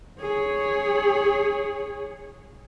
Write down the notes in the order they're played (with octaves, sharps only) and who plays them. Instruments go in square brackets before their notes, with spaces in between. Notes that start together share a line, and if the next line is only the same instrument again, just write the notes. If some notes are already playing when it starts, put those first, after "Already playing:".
[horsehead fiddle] G#4 C#5